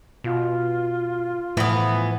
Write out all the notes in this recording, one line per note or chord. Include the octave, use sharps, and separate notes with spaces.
B2 F4
A2 E3 F3 B3